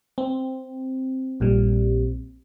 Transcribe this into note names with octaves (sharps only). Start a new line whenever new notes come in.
C4
A#1 A#2 G3